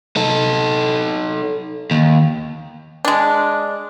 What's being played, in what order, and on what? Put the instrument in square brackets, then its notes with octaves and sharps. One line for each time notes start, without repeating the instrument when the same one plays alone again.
[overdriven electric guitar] D#4 A4
D#2
[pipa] G#3 D4